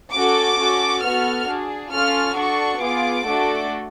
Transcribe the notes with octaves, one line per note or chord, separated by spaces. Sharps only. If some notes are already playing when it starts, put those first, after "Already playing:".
C#4 F#4 A4 D6
C#4 F#4 A4
B3 F#4 A4 F6
D4 G#4
C#4 F4 A4 F6
D4 F#4 A4 C#6
B3 F4 G#4 D6
A3 D4 F#4 A4